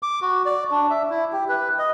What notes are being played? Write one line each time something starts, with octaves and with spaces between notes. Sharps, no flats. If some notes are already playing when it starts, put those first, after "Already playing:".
D6
F#4
D5
D4
E5
E4
G4
B4
D#5